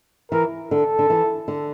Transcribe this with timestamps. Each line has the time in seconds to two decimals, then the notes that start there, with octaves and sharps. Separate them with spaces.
0.32 E3 A#4
0.71 D3 A4
0.99 D3
1.10 E3
1.48 D3